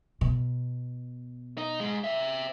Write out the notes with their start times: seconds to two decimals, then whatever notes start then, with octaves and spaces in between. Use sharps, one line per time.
0.21 B2
1.58 D#4
1.80 G#2 G#3
2.04 C5 E5